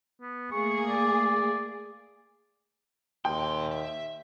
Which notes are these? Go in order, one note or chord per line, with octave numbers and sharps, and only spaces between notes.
B3
A3 A#3 G#4 C#6
D5
D#2 A#2 G5 C6
E5